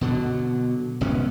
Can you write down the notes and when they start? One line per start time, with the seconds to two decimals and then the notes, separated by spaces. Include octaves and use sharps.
0.01 B2 D3 F#3
1.01 G#1 C3 B3 C#4